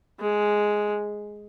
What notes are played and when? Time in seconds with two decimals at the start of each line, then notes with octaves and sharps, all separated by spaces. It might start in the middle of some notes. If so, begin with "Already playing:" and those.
0.20 G#3